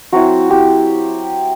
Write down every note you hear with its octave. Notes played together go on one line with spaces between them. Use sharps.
F#3 C4 E4 F#4
G4